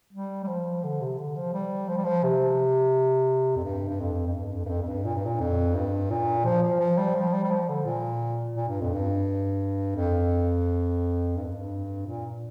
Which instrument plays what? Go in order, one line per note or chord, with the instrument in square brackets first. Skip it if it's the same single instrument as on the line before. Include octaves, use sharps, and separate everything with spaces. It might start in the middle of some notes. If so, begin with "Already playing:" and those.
[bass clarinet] G3
G3
F3
D3
C3
D3
F3
G3
F3
G3
F3
C3
F2
G2
G2
F2
F2
G2
F2
G2
F2
F2
G2
A#2
G2
A#2
F2
G2
A#2
F3
F3
F3
G3
F3
G3
G3
F3
D3
A#2
A#2
G2
F2
G2
F2
G2
F2
G2
A#2